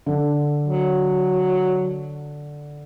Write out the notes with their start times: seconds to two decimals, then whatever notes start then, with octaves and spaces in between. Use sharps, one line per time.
0.06 D3
0.63 F#3